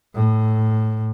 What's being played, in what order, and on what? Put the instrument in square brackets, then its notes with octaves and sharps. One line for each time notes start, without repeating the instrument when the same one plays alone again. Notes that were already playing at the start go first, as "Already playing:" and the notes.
[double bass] A2